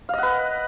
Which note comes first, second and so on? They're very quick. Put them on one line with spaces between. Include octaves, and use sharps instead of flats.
F5 D#5 F#5 B4